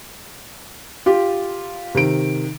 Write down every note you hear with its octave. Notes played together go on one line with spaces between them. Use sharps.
F4 G4
C3 D#3 D7